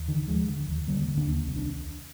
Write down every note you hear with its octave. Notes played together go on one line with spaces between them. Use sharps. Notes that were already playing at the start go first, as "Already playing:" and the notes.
Already playing: D#2
D3 D#3
D#2 F3 G#3
D3
D#2
D3 G3 A#3
D3
A#3 D4
D#2
C2 C4
D4